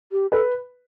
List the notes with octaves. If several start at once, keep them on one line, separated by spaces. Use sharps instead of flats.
G4
A4 B4